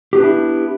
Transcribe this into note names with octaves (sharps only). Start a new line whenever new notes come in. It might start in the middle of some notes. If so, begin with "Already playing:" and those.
B3 D4 E4 G4